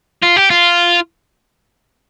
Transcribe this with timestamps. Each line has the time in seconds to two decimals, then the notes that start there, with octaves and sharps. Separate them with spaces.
0.23 F4
0.37 G4
0.50 F4